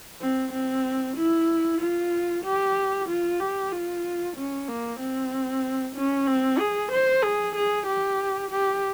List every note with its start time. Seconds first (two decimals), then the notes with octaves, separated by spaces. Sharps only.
0.21 C4
0.53 C4
1.17 E4
1.80 F4
2.44 G4
3.09 F4
3.40 G4
3.72 F4
4.36 C#4
4.68 A#3
5.00 C4
5.95 C#4
6.27 C4
6.59 G#4
6.92 C5
7.23 G#4
7.55 G#4
7.87 G4
8.51 G4